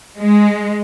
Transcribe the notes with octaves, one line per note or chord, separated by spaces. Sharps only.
G#3